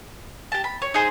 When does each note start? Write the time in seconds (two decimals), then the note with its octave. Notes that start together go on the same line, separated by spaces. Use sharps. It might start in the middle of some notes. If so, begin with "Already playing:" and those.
0.52 G4 A5
0.64 B5
0.82 C#5
0.94 D#4 G#4 C5